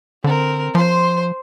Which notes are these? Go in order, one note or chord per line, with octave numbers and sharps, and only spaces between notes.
D3 C4 A#4
F3 C5 C6